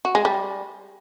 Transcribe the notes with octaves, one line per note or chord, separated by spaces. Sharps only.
F#4
G#3
G3